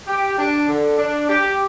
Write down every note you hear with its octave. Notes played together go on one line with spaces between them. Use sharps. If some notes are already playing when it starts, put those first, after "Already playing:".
G4
D4
D3
D4
G4